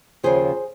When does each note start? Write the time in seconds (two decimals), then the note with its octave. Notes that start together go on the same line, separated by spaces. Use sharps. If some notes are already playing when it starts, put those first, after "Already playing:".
0.23 D#2 C#3 F3 G#4 C5